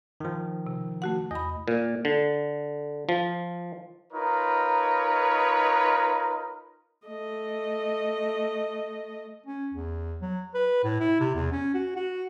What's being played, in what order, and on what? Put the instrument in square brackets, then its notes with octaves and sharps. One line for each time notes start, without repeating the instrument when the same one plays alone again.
[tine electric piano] D#3 F3
[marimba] C3
A3 F#4 F#5
[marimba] E2 B5 [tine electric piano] D#5
[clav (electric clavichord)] A#2
D3
F3
[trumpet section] D#4 F4 A#4 B4 C#5
[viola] A3 D#5
[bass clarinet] C#4
E2
F#3
B4
A2
E4
C3
E2
C#4
F#4
F#4